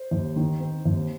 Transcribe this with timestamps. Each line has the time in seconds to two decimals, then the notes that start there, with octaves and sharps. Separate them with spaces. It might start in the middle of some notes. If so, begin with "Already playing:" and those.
Already playing: C5
0.11 D#2
0.36 D#3
0.60 C4
0.85 D#2